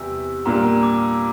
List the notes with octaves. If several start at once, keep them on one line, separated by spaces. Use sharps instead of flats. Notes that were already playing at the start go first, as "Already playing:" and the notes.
Already playing: E2 C3 E3 G3 E6
A#2 G3 A#3 D4 A#5
A#5
D6
E6